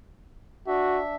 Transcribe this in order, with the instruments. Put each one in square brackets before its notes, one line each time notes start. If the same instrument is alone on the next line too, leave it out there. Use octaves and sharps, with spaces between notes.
[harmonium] D4 E5 [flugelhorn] F#4